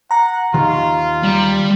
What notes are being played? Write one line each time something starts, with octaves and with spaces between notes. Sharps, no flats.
F#5 A#5
D#2 D#3 F4
G3